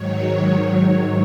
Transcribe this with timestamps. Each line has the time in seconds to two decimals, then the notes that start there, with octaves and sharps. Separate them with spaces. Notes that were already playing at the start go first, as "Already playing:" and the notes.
Already playing: G#2 D#3 F#3 C#5
0.27 C#5
0.66 C#5